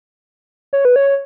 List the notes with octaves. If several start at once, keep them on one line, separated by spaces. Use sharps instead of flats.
C#5
B4
C#5